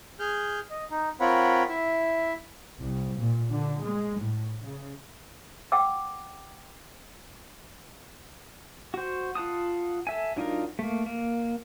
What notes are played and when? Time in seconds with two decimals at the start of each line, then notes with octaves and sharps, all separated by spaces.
0.19 G#4 F6 G6
0.70 D#5
0.91 D#4
1.20 C4 F4 A#4 C#5 F#5 B5
1.69 E4 E5
2.80 C2
3.19 A#2
3.50 D3
3.80 G#3
4.19 A2
4.64 C#3
5.72 F#5 G5 D6 E6
8.94 F#4 C5
9.35 F4 F#5 A5 D#6
10.07 A4 E5 G#5
10.36 F#3 D4 D#4 F4 A#4
10.79 A3 A#3
11.06 A#3